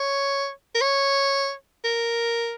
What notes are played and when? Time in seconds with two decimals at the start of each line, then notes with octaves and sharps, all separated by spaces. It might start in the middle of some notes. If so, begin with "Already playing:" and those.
Already playing: C#5
0.75 A#4
0.81 C#5
1.84 A#4